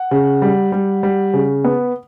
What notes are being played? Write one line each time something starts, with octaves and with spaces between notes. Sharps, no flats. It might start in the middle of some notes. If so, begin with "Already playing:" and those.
Already playing: F#5
C#3
G3
G3
G3
C#3
B3